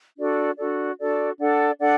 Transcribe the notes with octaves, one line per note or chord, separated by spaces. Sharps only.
D4 F#4 A4 D5
D4 F#4 A4 D5
D4 F#4 A4 D5
D4 A4 D5 F#5
D4 A4 D5 F#5